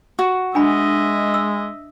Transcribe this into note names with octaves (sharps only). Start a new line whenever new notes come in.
F#4
G#3 D4 D#5 E5 G#5 B5
E6